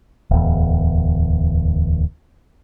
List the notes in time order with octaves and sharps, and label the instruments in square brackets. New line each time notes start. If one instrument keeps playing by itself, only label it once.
[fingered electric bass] D1 E2